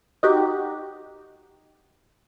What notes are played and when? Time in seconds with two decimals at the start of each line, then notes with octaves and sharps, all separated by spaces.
0.23 D#4 F#4 G4